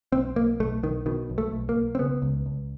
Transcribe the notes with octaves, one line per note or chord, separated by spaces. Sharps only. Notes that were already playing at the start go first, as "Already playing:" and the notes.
B1 C4
B1 A#3
B1 A3
B1 D#3
B2 D#3
B1
A3
B1
A#3
B1
C4
C#3 B3
C#2
C#2